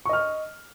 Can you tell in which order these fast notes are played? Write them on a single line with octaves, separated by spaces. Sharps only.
C#6 D#5 F6